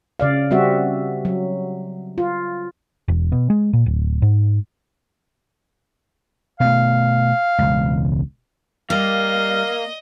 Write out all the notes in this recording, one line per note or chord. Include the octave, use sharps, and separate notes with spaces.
C#3 D5 F5
G3 C4 F#4 E5
F#3
F4
E1
B2
G#3
A#2
D1
G#2
B2 A3 F5
E1 C#2
G3 A#3 D#5 F5